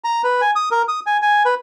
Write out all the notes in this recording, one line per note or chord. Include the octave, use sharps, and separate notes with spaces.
A#5
B4
G#5
D#6
A#4
D#6
G#5
G#5
B4